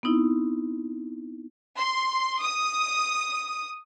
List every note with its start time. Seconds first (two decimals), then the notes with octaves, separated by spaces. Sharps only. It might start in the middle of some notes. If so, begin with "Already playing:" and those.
0.03 B3 C4 D#4 E4
1.78 C6
2.42 D#6